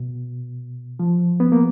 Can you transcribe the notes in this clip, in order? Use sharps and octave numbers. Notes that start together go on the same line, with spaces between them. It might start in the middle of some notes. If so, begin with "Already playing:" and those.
Already playing: B2
F3
B3
A#3